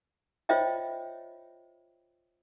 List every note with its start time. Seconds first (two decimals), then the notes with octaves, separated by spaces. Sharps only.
0.49 F4 C5 C#5 D#5 E5 G5